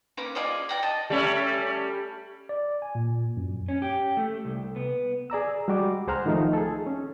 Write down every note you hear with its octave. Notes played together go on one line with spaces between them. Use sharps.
A#3 C#4 B4 D6
F4 G#4 D5 D#5
D5 G5 A#5
D#5 A5
G3 A3 C#4
D5
G#5
A#2
F#2
C#4
G4
A3
C2
B3
G#4 D5 A#5 E6
G3 G#3 F#4 G4 D6
C#2 G#4 C5 F#5 A#5 F6
D#3 F3 A3 D#4
G#4 A4
C#4